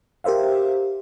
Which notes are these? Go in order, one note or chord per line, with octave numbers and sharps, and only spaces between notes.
G4 A#4 C5 E5 F5